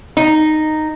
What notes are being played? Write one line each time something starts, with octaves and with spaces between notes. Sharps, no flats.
D#4